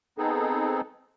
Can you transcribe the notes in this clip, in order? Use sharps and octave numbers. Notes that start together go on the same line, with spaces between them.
B3 C4 D#4 G#4 A4